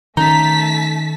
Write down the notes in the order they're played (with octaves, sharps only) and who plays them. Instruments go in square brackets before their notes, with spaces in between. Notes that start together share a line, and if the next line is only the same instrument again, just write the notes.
[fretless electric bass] D#3 C#4 [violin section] A3 A5 B6 [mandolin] D#4 [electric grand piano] A#5